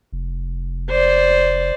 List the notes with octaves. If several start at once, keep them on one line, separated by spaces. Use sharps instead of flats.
F1
C5 D5